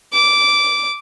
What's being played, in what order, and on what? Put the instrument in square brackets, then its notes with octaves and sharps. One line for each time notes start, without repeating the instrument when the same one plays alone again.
[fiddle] D6